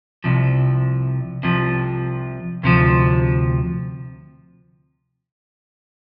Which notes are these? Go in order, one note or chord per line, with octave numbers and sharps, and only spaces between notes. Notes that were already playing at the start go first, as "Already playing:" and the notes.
C2 C3 F3
C2 C3 F3
D2 C3 F3